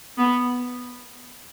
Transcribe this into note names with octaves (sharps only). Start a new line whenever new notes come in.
B3